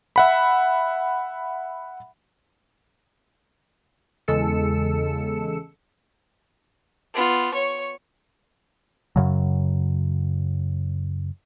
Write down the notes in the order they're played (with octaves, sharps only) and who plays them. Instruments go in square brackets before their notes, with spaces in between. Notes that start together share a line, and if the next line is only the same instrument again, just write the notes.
[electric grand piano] E5 F#5 B5
[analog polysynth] E2 C#3 G#3 A4 E6 C#7
[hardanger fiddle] B3 F4
C#5 C#6
[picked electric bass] F#2 C#3 F#3